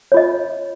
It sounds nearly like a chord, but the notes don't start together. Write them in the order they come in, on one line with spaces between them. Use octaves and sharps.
C#5 F4 D#5